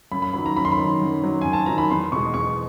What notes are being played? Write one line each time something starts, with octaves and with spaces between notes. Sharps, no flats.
F#2 B5
B5
D#3 F#3 B5
A#5
F#2 B5
C6
B5
D#3 F#3
F#2
D#3 F#3
F#2 G#5
A5
D#3 F#3 A#5
B5
E2 C6
B2 G#3 C#6
E2 C#6